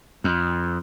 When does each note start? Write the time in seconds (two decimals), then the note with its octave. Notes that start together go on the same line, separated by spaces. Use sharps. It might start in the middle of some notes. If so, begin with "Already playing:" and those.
0.24 F2